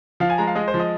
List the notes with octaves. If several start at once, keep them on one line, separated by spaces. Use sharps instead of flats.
F3 F5
G#5
G#3 A#5
F5
G#3 D#5
C5
F3
D#5